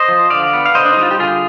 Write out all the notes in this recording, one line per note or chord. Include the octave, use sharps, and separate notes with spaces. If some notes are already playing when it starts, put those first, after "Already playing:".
Already playing: C5 D#5
F3
D3 D5 F5
B3
F5
D3 C5 D#5
D4
D#4
G3
F4
G4
D3 F4 G#4